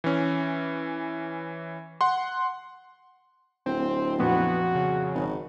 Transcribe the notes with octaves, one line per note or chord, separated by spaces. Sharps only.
E3 C#4
F#5 C6
D1 C4
F2 A#2 B3 F#4
C#3
G#1